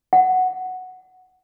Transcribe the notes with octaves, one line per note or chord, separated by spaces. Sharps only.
F#5